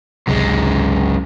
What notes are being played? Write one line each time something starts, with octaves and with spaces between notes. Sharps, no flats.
G#1 C#2 F#2 C3 G#3